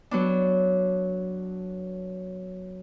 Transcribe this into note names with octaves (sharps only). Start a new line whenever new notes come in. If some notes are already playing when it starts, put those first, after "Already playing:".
F#3 B3 D4